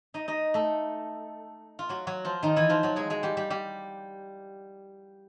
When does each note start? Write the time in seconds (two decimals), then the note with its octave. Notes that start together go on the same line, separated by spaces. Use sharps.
0.14 D#4 D#5
0.28 D#4 D#5
0.54 A3 A4
1.79 F4
1.89 F#3 F#4
2.07 F#3 F#4
2.25 F3 F4
2.43 D#3 D#4
2.56 E3 E4
2.69 F3 F4
2.83 F#3 F#4
2.96 G#3 G#4
3.10 G#3 G#4
3.23 G3 G4
3.37 G3 G4
3.50 G3 G4